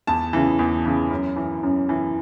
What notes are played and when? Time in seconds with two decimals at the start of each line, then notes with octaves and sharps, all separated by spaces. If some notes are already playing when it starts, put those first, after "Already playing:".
0.07 E2 A5
0.33 C#3 E3
0.59 E2
0.85 C#3 E3
1.11 F#2
1.36 E3
1.63 F#2
1.89 E3